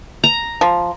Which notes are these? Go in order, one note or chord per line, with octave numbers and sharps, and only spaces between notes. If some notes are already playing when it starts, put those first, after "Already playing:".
A#5
F3